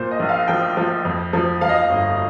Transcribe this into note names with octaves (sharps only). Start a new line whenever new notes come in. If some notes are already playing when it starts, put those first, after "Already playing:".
Already playing: A#2 C5
D#5
A#1
F5
F3 G5
F3
F2
F3
F3 F5
D#5
F5
G1